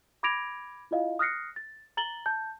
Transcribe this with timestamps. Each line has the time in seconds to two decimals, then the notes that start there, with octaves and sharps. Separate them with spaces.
0.23 B5 D6 G#6 A#6 D7 F7
0.91 E4 F4 D#5 F5
1.19 D#6 F6 F#6 A#6 C7 C#7
1.56 A6
1.97 A#5 A6 F#7 G7
2.26 A5 G6